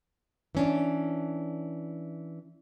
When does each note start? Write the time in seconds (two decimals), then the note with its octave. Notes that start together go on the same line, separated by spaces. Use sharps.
0.55 E3 C#4 D4